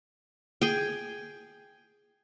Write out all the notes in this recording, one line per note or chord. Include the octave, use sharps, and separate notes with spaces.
G#4 G5